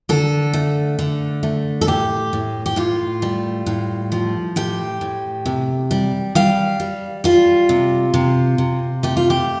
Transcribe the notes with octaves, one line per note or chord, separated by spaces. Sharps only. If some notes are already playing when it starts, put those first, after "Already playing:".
D3 A4
A3
D3
A3
A4
A2 G4
A2
G4
A2 F4
G3
A2
F3
A2 G4
A2
C3
G3
G3 F5
G3
G3 F4
C3
C3
C3
A3 G4
F4
G4